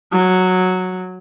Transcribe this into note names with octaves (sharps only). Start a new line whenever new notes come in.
F#3